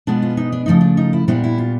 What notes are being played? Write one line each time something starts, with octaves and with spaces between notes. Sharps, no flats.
B2 G#3 B3 D4 F4
F4
D#4
D4
C#3 F3 A3 C4 D#4
D4
D#4
E4
A#2 G3 B3 D4 E4
E4
F4